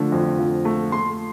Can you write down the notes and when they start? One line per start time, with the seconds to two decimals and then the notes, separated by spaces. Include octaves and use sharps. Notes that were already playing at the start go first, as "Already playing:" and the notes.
Already playing: D3 F3 A3
0.12 F2
0.39 F3
0.65 A3
0.92 A3 C6